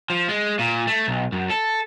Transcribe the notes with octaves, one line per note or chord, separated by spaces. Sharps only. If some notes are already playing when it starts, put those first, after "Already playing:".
F3
G#3
A#2
A3
B1
F#2
A4